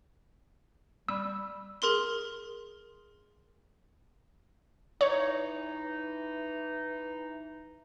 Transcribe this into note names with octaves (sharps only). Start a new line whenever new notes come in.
G3 E6
G#4 A#4 C6 G7
E3 D#4 C#5